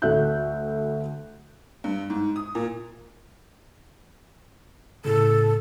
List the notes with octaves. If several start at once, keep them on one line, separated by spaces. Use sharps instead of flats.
D2 F#4 A4 E5 F#6 G6
G2
G#2
D#6
A#2
A2 C#3 A4